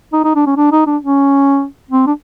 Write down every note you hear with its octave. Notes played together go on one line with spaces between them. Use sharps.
D#4
D#4
D4
C#4
D4
D#4
D4
C#4
C4
D4